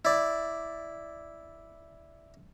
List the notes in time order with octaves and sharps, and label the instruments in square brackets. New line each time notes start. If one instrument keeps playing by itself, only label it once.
[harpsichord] E4 D5